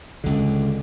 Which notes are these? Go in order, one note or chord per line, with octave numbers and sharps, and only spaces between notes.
C#2 D3